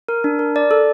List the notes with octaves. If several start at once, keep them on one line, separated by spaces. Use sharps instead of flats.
A#4
D4
A#4
D5
A4